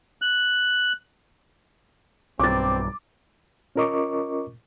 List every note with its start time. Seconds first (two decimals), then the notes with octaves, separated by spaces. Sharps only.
0.22 F#6
2.40 B1 G2 C4 D6 A6
3.76 C#4 F4 A#4 D#5 C#6 D6